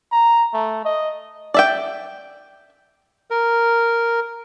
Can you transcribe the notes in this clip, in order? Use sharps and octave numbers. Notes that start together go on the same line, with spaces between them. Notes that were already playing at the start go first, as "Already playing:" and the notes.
A#5
A3
D#5
D5 E5 G5
A#4